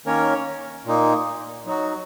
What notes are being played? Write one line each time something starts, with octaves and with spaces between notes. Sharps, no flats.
D#3 A#3 C#4 A#4 C#5
A#2 A#3 D#4
F#3 D#4 F#4